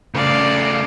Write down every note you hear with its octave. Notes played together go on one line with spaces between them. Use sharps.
C#3 A3 D5 F5